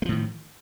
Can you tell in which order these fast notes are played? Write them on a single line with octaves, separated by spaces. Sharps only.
A3 F3 A2 D#3